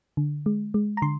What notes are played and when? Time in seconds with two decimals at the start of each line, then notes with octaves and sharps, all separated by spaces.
0.17 D3
0.46 G#3
0.74 G#3
0.97 A#5
1.02 D3 C6